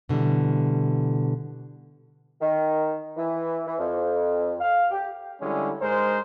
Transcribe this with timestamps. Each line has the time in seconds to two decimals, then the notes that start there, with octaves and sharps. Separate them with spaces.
0.09 B2 D3 E3 G3
2.41 D#3
3.17 E3
3.66 E3
3.79 F2
4.61 F5
4.90 G4
5.41 D3 G3 G#3 C#4 E4
5.80 G#2 G#3 A#4 C5